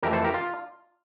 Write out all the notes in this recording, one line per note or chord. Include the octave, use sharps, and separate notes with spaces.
F2 E3 A3 G4 A#4
A4 C5
G4 A#4
F4